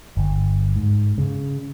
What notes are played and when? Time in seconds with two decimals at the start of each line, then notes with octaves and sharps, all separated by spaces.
0.17 G1
0.76 G#2
1.18 C#3